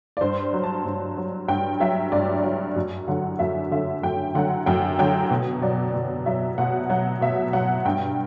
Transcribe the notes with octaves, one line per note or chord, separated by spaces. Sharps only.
D5
G2 C5
F#3
A5
G2
F#3
G2 G5
F#3 E5
G2 D5
F#3 D5
F#2
D3 F#3 F#5
F#2 E5
D3 F#3 E5
F#2 G5
D3 F#3 F#5
F#2 G5
D3 F#3 G5
B2
F#3 D5
B2
F#3 E5
B2 F#5
F#3 F#5
B2 E5
F#3 F#5
G2 G5